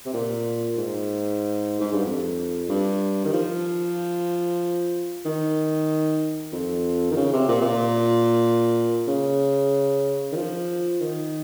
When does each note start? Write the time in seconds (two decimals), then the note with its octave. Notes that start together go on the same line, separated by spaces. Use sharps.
0.05 C3
0.14 A#2
0.77 G#2
1.80 G#2
1.93 G2
2.06 F2
2.69 G2
3.25 D#3
3.33 F3
5.26 D#3
6.52 F2
7.11 D#3
7.16 C#3
7.33 C3
7.48 A#2
7.61 C3
7.64 A#2
9.08 C#3
10.32 D#3
10.36 F3
11.01 D#3